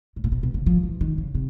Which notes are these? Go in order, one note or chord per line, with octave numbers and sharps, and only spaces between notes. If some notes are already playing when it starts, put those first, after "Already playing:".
A2
A#2
B2
B2
C#3
F3
E3
D#3
C#3
C3